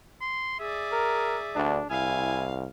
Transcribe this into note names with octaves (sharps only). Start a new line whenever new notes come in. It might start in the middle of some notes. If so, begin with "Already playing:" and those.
C6
G#4 D5 E5
A#4
D2 D4
C2 E4 F5 G#5